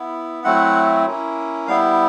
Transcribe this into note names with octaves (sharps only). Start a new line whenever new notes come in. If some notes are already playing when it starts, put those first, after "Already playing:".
Already playing: B3 E4
F#3 A3 C4 E4 F#5
A#3 C#4 E4
G3 B3 E4 F5